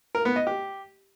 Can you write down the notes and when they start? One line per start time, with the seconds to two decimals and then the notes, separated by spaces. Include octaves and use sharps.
0.15 A#4
0.25 B3
0.36 D#5
0.47 G4